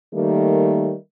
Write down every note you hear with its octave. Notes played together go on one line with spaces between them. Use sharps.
D#3 G3 A3 A#3